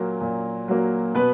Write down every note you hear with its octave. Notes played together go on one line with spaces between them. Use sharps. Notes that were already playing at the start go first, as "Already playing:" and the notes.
Already playing: A#2 F#3 A#3
A#2
F#3 A#3
B2 B3 B4